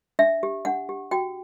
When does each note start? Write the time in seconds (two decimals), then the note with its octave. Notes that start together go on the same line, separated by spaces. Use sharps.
0.19 D4 E5
0.43 G4
0.65 D4 F#5
0.89 G4
1.11 F#4 G5